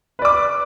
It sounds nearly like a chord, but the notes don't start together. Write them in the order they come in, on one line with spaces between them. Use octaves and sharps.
B4 D5 D6